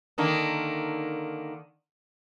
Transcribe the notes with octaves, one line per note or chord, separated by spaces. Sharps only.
D3 D#3 A#3